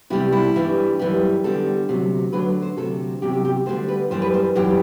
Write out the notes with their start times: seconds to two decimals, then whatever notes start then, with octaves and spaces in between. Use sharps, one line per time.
0.10 E2 C3 G3 E4
0.32 E4
0.55 G2 E3 G3
0.99 F#2 E3 G3
1.44 E2 D3 G3 A4
1.89 D2 C3 F#3
2.33 D2 D3 F#3 B4
2.62 C5
2.77 D2 C3 F#3 A4
3.22 E2 C3 F#3 G4
3.33 G4
3.45 G4
3.66 D2 D3 G3 C5
3.88 B4
4.11 F#2 E3 G3 C5
4.22 B4
4.34 C5
4.56 F#2 E3 G3 G4